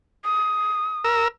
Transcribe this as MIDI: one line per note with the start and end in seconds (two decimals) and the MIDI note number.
0.24 1.02 87
1.04 1.28 70
1.04 1.28 88